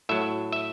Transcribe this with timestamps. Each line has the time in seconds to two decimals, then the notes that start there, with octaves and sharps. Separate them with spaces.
0.09 A2 F#3 E5
0.53 E5